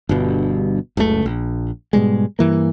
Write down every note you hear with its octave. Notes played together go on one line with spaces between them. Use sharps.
G1 G2 B2
F#1 C#2 B2 A3
A#1
G#2 B2 G3 G#3
G2 E3 A#3